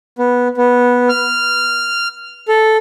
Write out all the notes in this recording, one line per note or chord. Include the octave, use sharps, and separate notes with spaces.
B3
B3
F6
A4